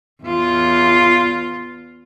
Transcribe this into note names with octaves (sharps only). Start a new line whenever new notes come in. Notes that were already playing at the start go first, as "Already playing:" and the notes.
E2 F4